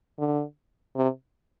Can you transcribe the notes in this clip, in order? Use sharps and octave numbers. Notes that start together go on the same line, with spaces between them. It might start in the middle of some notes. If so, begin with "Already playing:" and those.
D3
C3